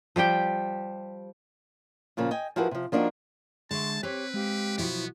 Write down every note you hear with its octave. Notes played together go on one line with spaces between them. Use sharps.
F3 G3 G4 G5
A#2 C#3 F3 A#3
D#5 G5 G#5
F3 E4 F#4 G#4 A#4 B4
C3 F3
F3 A#3 D4 D#4 F#4
D3 G#3 G#4 E5 A5 C6 C#6
C4 G4 B4 C#5 D6
G#3 G4 F5
B1 F3 B3 E4 F#4